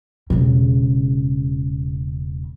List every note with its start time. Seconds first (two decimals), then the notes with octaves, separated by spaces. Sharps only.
0.30 E1 C#3